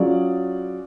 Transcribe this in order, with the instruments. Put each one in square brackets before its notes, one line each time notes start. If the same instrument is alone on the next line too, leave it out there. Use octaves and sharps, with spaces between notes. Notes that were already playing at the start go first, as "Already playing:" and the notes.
Already playing: [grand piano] F#3 C#4 F4 G#4 D5